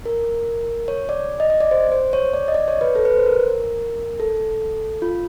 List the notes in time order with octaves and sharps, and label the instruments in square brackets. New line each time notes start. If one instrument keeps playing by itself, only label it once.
[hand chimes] A#4
C#5
D5
D#5
D#5
D5
C5
C5
C#5
D5
D#5
D5
C#5
B4
A4
B4
C5
A#4
A4
F4